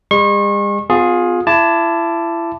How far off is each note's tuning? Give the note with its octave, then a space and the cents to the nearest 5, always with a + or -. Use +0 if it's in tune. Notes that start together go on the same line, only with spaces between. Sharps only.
G#3 -45 C#6 -35
B3 +45 F4 +25 G#4 +0
E4 +30 A5 +0 D6 +0